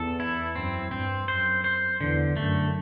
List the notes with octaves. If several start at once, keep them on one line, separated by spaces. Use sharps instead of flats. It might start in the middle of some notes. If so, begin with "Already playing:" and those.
Already playing: E2 A4
E4
F#2 C4
G2 C4
F#2 C5
C5
E2 D3
F#2 A3